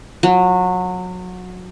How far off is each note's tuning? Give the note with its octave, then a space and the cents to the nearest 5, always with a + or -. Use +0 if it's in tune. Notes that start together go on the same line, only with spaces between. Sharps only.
F#3 -25